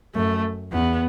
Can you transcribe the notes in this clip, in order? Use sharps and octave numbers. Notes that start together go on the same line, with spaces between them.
F#2 A3
E2 B3